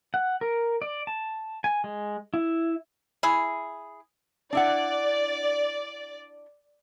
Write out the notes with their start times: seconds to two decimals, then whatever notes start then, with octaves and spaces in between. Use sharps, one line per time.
0.14 F#5
0.41 A#4
0.82 D5
1.07 A5
1.64 G#5
1.84 G#3
2.34 E4
3.23 E4 G#4
4.53 D4 E4 D5 F#5